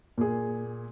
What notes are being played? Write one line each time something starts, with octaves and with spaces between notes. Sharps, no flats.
A#2 G#4